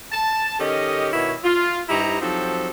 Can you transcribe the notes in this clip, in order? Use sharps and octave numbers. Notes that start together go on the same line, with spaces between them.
A5
D#3 C#4 G4 A4 D#5
B2 D#3 E4 F#4 C#5
F4
G2 D#4 E4 G4 C5 A#5
F3 F#3 C4 D#4 G4 A4